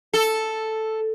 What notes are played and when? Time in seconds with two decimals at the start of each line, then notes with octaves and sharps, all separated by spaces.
0.13 A4